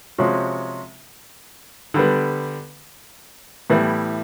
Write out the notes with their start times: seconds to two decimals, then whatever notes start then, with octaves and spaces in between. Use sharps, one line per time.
0.18 C3 F3 G#3 C#4 F#4
1.94 D3 G3 B3
3.70 A2 E3 G3 B3 E4